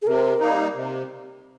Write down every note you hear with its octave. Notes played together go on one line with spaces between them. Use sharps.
G#4
C3 A#4
G3 A#3 D#4
C3